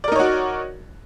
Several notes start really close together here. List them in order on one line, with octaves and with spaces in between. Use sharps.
D5 A#4 D#4 C#5 F#4